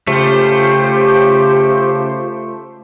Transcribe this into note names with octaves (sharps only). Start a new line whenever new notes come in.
C#3 A3 F4 G4 C5